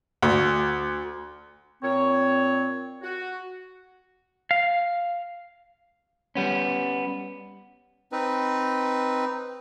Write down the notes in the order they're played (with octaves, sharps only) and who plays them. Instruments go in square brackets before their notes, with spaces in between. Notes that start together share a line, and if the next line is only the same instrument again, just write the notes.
[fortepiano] D2
[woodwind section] A#2 C4 C#5
F#4
[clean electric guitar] F5
G3 B3 C#4
[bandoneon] C4 D#4 B4